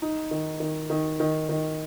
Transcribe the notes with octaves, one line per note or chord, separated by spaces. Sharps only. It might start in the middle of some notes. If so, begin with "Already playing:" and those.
D#4
D#3
D#3
D#3
D#3
D#3